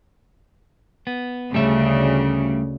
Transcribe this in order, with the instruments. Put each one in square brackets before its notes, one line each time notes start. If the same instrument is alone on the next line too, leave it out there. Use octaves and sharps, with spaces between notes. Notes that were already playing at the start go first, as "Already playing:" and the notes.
[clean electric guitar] B3
[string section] D2 C#3 [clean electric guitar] G3 A3 E5